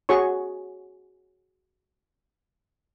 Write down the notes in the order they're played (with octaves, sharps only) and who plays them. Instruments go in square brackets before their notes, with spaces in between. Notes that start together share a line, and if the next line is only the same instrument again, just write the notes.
[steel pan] F#4 G#4 C#5 C#6